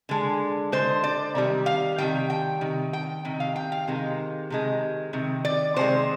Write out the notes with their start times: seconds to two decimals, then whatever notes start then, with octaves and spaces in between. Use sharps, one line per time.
0.09 D3 G#3
0.72 D3 G#3 C5
1.04 D5
1.35 C3 D#3 G3
1.66 F5
1.98 C3 D#3 G3 G5
2.30 G5
2.61 C3 D#3
2.93 G5
3.25 C3 D#3
3.40 F5
3.56 G5
3.72 F5
3.87 C3 D#3 G#3
4.50 C3 D#3 G#3
5.13 C3 D#3
5.45 D5
5.76 C3 D#3 G#3 C5